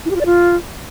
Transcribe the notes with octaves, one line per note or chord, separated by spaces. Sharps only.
E4
G4
F4
D5
F4